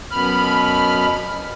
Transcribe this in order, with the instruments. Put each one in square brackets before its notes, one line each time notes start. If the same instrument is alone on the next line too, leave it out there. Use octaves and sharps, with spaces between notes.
[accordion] F#2 B2 B5 F6